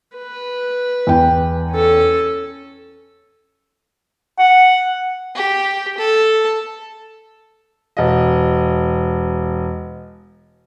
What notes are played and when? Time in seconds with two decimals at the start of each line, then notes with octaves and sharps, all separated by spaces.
0.17 B4
1.07 E2 G5
1.72 C#4 A4
4.39 F#5
5.35 G4
5.98 A4
7.97 E1 D#5